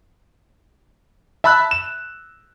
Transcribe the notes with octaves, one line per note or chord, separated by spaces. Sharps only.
E5 A5 B5 E6 F#6
E7